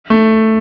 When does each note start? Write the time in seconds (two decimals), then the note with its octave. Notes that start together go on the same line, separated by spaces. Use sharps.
0.10 A3